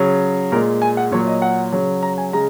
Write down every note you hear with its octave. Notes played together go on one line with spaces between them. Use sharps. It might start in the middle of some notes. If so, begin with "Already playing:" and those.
Already playing: C#3 F#3
A#2 G#3 A#4
G#5
F#5
A#2 F#3 C#5
D#5
F#5
C#3 F#3
A#5
G#5
C#3 G#3 A#5